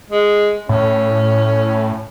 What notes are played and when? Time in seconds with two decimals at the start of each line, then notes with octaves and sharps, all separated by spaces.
0.10 G#3
0.69 A2 C#4